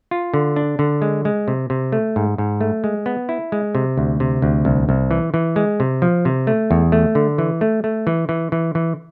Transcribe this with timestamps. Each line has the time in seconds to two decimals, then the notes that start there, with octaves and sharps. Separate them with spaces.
0.11 F4
0.34 D3
0.56 D4
0.79 D3
1.02 G#3
1.25 G#3
1.48 C3
1.70 C3
1.92 A3
2.16 G#2
2.38 G#2
2.61 A3
2.84 G#3
3.06 B3
3.29 E4
3.52 G#3
3.75 C3
3.98 D2
4.20 C3
4.42 D2
4.65 C2
4.89 C2
5.11 E3
5.34 E3
5.56 G#3
5.80 C3
6.02 F3
6.25 C3
6.47 A3
6.71 E2
6.92 A3
7.15 D3
7.38 E3
7.61 A3
7.84 A3
8.07 E3
8.29 E3
8.52 E3
8.75 E3